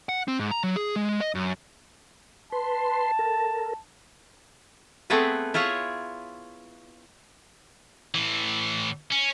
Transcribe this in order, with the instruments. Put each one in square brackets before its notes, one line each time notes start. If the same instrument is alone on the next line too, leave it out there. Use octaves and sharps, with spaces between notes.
[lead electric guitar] F#5
C4
G#2
A#5
F#3
G#4
G#3
D#5
F#2
[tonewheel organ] B4 C6 [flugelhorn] A5
[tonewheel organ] A4 A#4
[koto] A3 B3 C4 G#4 A4 B4
E4 F4 G#4 C#5 E5
[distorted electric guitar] A2 E3
C#4